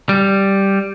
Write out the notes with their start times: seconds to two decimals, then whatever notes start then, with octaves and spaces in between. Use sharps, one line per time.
0.09 G3